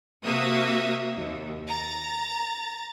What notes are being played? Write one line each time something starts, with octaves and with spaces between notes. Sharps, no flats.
C3 A#3 F#4 E5 F5 D#6
D#2
A#5 A6